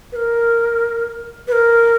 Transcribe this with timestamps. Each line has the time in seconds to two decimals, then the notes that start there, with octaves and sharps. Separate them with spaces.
0.12 B4
0.16 A#4
1.47 B4
1.52 A#4